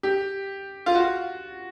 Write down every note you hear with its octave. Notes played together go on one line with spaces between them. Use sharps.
G4
F4
F#4